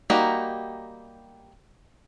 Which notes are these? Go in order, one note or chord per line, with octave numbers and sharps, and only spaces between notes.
G3 A#3 D#4 F#4 G4